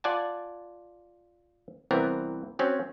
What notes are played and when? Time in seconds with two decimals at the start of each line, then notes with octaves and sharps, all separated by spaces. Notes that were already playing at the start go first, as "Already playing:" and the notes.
0.04 F4 D5 F#5 G#5 A5
1.91 C2 E3 B3 C4 A#4
2.59 F#3 C4 C#4